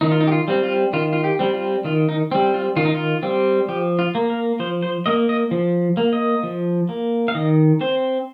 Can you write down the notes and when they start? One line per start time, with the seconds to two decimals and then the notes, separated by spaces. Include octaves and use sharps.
0.01 D#3 D#4
0.11 F4
0.20 D#4
0.27 G4
0.32 F4
0.48 G3 C4
0.63 F4
0.93 D#3 F4
1.13 F4
1.24 G4
1.39 G3 C4
1.54 F4
1.84 D#3 F4
2.09 D#4
2.32 G3 C4
2.54 F4
2.76 D#3 F4
2.85 D#4
2.94 F4
3.23 G3 C4
3.68 F3 G4
3.99 F4
4.15 A#3
4.30 A#4
4.60 F3 C5
4.82 C5
5.06 A#3 D#5
5.29 D#5
5.51 F3
5.97 A#3
6.13 D#5
6.43 F3
6.89 A#3
7.28 F5
7.35 D#3 D#5
7.81 C4 C5